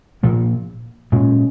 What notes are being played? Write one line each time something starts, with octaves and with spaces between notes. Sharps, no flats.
A#2 F3 A#3
A#2 G#3 C#4